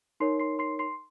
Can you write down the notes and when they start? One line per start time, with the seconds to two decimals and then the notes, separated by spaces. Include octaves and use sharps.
0.20 D#4 A#4 C#5 C6 C7
0.39 C6 C7
0.59 C6 C7
0.79 C6 C7